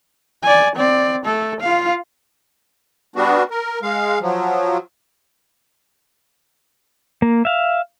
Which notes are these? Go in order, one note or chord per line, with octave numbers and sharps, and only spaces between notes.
D5 G#5
C4 D5
A3 A4
F4 F5
G3 B3 D4 F#4
A#4
G#3 F5
F3 F#3
A#3
E5 F5